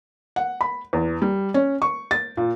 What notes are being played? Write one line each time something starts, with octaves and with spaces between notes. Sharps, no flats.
F#5
B5
E2
G3
C#4
C#6
A6
A#2